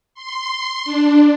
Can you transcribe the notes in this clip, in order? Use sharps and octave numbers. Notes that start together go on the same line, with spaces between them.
C6
D4